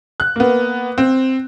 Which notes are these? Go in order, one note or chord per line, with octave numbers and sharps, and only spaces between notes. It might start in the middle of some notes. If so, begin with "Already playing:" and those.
F#6
A#3 B3
C4